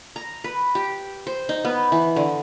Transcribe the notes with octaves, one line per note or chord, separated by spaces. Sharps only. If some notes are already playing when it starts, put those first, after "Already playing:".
A#5
B4
G4
C5
D#4
B3
E3
D3